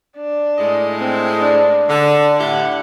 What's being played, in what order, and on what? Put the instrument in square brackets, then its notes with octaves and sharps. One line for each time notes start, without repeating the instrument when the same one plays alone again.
[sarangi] D4
[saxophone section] A2 G#3 D#5
[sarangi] C4
D4
[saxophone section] D3 [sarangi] D4
[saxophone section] A2 E4 G4 [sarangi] F#5